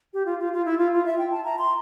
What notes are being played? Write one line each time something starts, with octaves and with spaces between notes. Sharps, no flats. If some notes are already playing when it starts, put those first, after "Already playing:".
G4
F4
F4
F4
E4
F4
F4
E5
G5
A5
A#5
C6